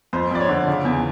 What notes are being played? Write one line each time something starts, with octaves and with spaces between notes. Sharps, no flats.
F2 C5
F2 D5
C#5
D3
C#3
E2